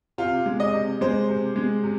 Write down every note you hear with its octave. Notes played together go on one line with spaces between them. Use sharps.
C3 F4
G#3
D#5
C3
G#3 C5
C3
G#3
C3